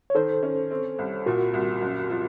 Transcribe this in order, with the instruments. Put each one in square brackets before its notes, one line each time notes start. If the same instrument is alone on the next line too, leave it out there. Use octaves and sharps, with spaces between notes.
[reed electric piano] C#5
[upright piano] D#3 [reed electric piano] A4 C5
[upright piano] C#4
C4
C2
[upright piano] A#2 [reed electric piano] F#4 A#4
[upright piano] C2
F#1
F3